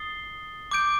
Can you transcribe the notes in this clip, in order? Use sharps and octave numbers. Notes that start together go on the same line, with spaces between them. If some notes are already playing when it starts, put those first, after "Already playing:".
Already playing: D#6 A6 C7 G7
D6 G6 D7